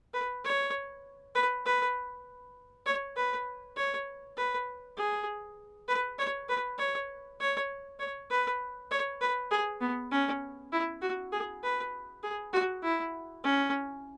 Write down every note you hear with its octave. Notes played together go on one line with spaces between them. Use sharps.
B4
C#5
B4
B4
C#5
B4
C#5
B4
G#4
B4
C#5
B4
C#5
C#5
C#5
B4
C#5
B4
G#4
B3
C#4
E4
F#4
G#4
B4
G#4
F#4
E4
C#4